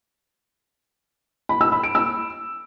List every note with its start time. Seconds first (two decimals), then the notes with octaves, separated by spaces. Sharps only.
1.49 B5
1.61 E6
1.72 B5
1.83 D7
1.95 E6